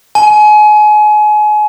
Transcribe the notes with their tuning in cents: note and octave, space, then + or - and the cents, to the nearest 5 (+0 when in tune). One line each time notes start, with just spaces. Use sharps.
G#5 +30